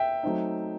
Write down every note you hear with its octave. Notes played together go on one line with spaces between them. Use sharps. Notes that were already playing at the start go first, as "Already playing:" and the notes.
Already playing: E5 G5
F#3 A3 C4 D#4